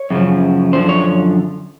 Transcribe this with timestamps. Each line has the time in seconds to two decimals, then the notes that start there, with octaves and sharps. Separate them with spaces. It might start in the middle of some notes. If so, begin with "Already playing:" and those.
Already playing: C#5
0.10 F#2 C#3 F3
0.73 F#2 D3 F3 C5
0.89 C#5